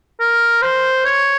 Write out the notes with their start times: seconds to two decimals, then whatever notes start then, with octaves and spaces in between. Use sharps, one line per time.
0.20 A#4
0.62 C5
1.05 C#5